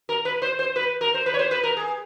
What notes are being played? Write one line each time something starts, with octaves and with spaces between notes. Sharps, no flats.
A#4
B4
C5
C5
B4
A#4
C5
B4
C#5
C5
B4
A#4
G#4